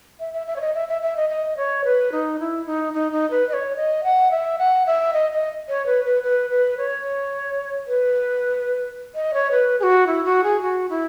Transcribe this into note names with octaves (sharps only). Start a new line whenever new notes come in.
E5
E5
E5
C#5
D#5
E5
E5
E5
D#5
D#5
C#5
B4
D#4
E4
D#4
D#4
D#4
B4
D#5
C#5
D#5
F#5
E5
F#5
E5
D#5
D#5
C#5
B4
B4
B4
B4
C#5
B4
D#5
C#5
B4
G#4
F#4
E4
F#4
G#4
F#4
E4